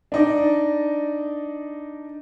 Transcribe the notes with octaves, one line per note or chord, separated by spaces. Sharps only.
D4 D#4 D5